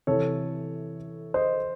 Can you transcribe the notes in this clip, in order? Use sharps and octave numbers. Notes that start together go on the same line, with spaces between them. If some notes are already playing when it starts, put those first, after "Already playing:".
C3 E3 A4 C#5
C5 D#5